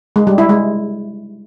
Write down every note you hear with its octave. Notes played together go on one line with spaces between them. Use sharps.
G#3
G3
E4
G#3